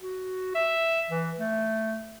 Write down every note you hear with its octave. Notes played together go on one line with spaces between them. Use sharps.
F#4
E5
E3
A3